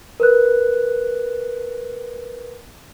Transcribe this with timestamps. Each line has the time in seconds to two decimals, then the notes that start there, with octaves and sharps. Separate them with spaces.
0.20 A#4 B4 F#6